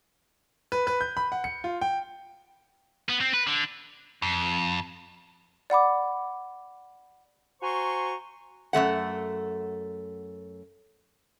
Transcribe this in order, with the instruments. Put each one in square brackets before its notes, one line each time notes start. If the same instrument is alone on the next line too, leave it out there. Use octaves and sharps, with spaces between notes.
[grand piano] B4
B4
G6
B5
F#5
C#7
F4
G5
[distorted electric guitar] B3
C4
B4
D3
[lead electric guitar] F2
[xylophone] D5 F#5 B5 D6
[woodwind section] F#4 C5 G#5 A#5 C6 C#6
[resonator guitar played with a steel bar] F#2 G#3 A3 F#5